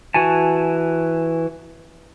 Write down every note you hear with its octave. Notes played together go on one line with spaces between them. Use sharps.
E3 F#4 G#5 A5